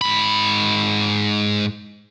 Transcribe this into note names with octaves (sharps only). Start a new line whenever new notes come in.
G#2 B5